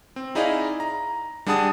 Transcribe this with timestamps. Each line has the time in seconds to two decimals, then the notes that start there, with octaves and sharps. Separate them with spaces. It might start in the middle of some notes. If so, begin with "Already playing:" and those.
0.16 C4
0.35 D#4 E4 G#4 D5 D#5 F5
0.80 A#5
1.46 G3 D4 G#4 F#5 A5 D#6